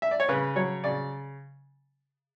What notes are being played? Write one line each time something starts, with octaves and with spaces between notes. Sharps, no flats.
E5
D5
C#5
C#3 B4
F#3 C#5
C#3 D5